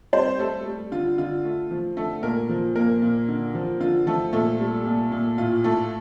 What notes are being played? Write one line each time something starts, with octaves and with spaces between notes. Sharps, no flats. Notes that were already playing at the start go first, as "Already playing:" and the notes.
G3 C4 C5
G3 A3 A4
G3
D3 F4
D3 F4
A3
F3
D3 A3 A4
A#2 A#3 A#4
F3
A#2 A#3 A#4
A#2
D3
F3
D3 F4
F3 A3 A4
A#2 A3 A4
G3
A#2
A#2
A2 F4
A2 A3 A4